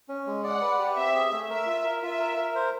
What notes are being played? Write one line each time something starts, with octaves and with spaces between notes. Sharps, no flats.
C#4
G#3
D5 F#5
B4
G4
C4 E5
G#4
A3
A#4 E5
F4
A#4
F4 E5
A#4
A#4
C5